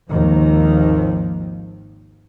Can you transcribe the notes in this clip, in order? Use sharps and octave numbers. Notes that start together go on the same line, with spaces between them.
G#1 D#2 D#3 F3